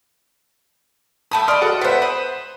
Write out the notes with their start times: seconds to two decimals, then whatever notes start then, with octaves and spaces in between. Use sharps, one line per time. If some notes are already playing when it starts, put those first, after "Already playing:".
1.31 A3 A5 B5 D#6
1.48 D5 D#5 C6 D#6 F6
1.62 F#4 A4 F#5
1.81 B3 B4 C5 E5
2.02 B5 D#6